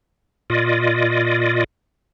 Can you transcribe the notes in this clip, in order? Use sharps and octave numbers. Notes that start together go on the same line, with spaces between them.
A#2 F4 D5 D#5